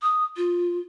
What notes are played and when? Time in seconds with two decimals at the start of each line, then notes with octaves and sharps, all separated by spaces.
0.02 D#6
0.37 F4